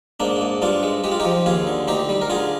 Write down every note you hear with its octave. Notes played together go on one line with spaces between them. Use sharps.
G#2 A#3 D4
G#2
G2 D4 F4
G#3
G#3 G4
F4
D#4 G4
F3
D#2 F4 G#4
D3
D2 D#4 G4
G3
A#4
D3 F4 G#4